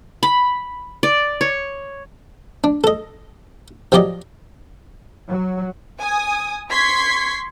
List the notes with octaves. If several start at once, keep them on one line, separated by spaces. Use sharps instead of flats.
B5
D5
C#5
D4
A4 D#5
F3 F#3 G4 D5 D#5
F#3
G#5 D#6
C6 C#6 G#6 B6 C7